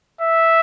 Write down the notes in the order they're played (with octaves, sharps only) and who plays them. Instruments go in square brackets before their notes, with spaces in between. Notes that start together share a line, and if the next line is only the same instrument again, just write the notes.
[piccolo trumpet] E5